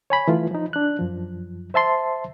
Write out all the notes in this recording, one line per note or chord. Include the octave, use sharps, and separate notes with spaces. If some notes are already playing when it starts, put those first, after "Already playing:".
C#5 G#5 B5
E3 A3 F4
F3 D#4
D4 F#6
F#2 F3
C5 E5 A5 C6